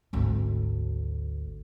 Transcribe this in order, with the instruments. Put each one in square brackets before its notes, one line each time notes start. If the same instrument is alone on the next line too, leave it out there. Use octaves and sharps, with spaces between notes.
[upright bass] G#1 D2